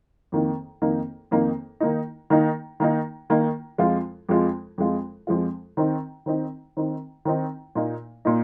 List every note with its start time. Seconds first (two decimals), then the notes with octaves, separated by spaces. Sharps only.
0.32 F2 D#3 A#3 D#4
0.82 F2 D#3 A#3 D#4
1.31 F2 D#3 A#3 D#4
1.80 D#3 A#3 D#4
2.30 D#3 A#3 D#4
2.80 D#3 A#3 D#4
3.30 D#3 A#3 D#4
3.78 F2 F3 G#3 F4
4.29 F2 F3 G#3 F4
4.78 F2 F3 G#3 F4
5.27 F2 F3 G#3 F4
5.77 D#3 C4 D#4
6.26 D#3 C4 D#4
6.77 D#3 C4 D#4
7.25 D#3 C4 D#4
7.75 A#2 A#3 D#4
8.25 A#2 A#3 D#4